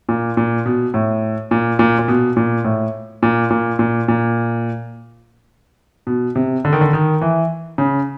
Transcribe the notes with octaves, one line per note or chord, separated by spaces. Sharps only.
A#2
A#2
B2
A2
A#2
A#2
A#2
B2
A#2
A2
A#2
A#2
A#2
A#2
B2
C3
D3
D#3
D3
D#3
E3
C#3